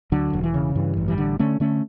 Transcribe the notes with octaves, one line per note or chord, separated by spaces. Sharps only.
D2 D3 F#3
E1
E3
C#3
G2 E3
A1
E3 G3
D3
D3 A3 C#4
D3 A3 C#4